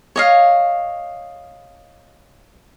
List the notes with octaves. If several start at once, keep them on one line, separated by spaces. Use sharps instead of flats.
C#5 D#5 F5